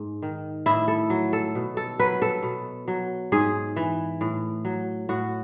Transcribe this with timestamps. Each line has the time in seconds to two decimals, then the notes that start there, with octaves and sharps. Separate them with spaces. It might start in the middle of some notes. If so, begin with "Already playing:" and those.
Already playing: G#2
0.22 D#3
0.66 A2 E4
0.88 A4
1.10 F#3
1.33 A4
1.55 B2
1.77 A4
1.99 F#3 B4
2.22 A4
2.43 B2
2.88 F#3
3.32 G#2 G#4
3.76 E3
4.21 A2
4.65 F#3
5.09 A2 F#4